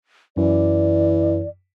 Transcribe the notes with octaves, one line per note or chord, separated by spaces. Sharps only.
F#2 E3 D5